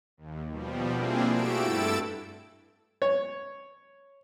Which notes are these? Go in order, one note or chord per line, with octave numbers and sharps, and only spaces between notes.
D#2
B2 F3 G3
A#3 C4 D4 E4 F4 G#4
A3 F#4 G4 E6 D7
G2 E4 A4 E6 A6 D7
C#5